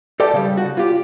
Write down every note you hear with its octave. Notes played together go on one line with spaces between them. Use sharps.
G4 A4 D5 G5
C#3 G3
F#4
F4 G4